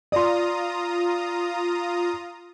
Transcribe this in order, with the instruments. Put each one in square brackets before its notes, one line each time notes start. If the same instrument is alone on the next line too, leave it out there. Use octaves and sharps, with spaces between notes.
[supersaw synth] F4 A#5 D#6 [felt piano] D5 C6